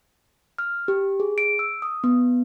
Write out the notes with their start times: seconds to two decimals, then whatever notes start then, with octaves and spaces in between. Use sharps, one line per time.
0.58 F6
0.88 G4
1.20 G#4
1.38 D7
1.59 E6
1.82 D#6
2.04 B3